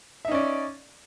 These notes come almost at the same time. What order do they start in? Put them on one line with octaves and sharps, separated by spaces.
E5 D#4 C#4 D5